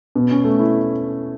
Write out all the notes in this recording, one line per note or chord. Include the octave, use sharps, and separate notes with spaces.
B2
C#4
A3
E4